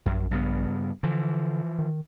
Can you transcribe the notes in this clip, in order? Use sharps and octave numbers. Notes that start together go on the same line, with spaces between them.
A#1 F#2
G2 C#3 B3
D3 E3 F3
D#3